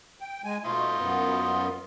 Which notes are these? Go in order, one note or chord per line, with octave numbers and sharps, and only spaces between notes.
G5
G#3 G#5
B2 A3 D#4 F4 C5
F#2 B3